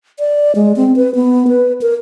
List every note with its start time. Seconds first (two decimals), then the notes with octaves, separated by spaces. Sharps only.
0.19 D5
0.55 G#3
0.76 C4
0.96 B4
1.15 B3
1.48 B4
1.82 A#4